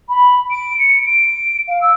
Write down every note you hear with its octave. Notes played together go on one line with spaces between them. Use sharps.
B5
D7
C#7
D7
F5
E6